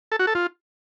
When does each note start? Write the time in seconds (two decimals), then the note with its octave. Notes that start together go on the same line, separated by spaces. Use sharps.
0.12 A4
0.19 F#4
0.27 A4
0.35 F4